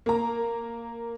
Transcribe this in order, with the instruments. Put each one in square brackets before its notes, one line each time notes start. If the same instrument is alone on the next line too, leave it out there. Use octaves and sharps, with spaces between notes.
[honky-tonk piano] A#3 A#5